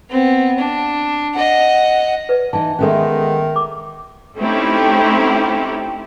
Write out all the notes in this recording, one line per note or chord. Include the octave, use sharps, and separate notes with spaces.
B3 C4
D4
D#5 F#5
B4 D5
E3 D#4 A5
D#3 G#3 A3 B3 C#4 A#4
D6
A3 C4 C#4 D#4 E4 G4